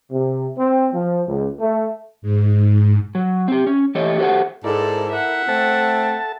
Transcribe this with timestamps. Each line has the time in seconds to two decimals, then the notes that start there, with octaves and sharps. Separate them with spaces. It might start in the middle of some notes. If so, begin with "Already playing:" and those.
0.11 C3
0.58 C4
0.94 F3
1.29 C#2
1.60 A3
2.22 G#2
3.15 F#3
3.48 C4 G4
3.67 C#4
3.95 E3 A3 G4 C#5 D#5
4.18 F#4 G4 A4 B4 C5 F#5
4.64 G#2 E4 A4 A#4 D5
5.11 E5 F#5
5.48 A3 C4 A4 A5